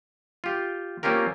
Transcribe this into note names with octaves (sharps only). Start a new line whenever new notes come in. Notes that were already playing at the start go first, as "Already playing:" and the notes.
F4 G4
A#3 C4 C#4 F4 G4 A#4